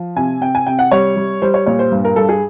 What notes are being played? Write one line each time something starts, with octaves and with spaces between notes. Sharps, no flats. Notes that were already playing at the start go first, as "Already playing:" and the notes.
Already playing: F3
C3 G#5
C3 G5
G#5
C3 G5
F#5
G3 C#5
G3
G3 C5
C#5
A#2 C#5
C5
G2
A#4
G2 A4
G#4